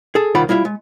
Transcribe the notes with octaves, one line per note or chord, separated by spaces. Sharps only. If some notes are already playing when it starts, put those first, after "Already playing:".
G#4 A4
C2 D#3 F4 D5 F#5 B5
G3 E4 F4 E5
G#3